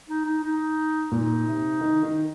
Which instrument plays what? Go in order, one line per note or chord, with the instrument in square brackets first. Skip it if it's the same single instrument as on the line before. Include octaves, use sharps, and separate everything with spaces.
[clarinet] D#4
D#4
D#4
[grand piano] A#2 [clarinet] D#4
[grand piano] C3
D#3
D#3